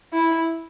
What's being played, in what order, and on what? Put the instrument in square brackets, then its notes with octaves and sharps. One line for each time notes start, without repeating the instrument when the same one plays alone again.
[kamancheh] E4